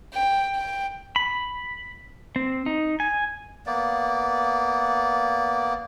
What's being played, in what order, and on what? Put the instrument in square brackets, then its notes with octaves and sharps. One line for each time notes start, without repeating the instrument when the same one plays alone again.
[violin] G5
G5
[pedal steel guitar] B5
C4
D#4
G#5
[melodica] A#3 B3 D5